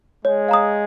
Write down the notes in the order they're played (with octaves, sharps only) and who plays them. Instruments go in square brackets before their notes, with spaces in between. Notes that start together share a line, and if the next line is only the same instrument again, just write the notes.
[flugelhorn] G#3 [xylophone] C#5
[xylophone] F5 A#5 D#6